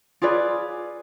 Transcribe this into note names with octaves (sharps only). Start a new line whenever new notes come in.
F4 G#4 B4 D5